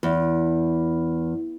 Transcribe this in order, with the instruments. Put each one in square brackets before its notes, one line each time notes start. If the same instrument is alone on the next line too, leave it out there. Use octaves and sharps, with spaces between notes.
[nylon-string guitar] E2